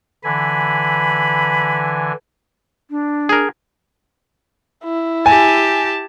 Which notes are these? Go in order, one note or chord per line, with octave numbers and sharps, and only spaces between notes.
D3 E3 G#5 B5
D4
G#4 A#4
E4
G4 G#5 A5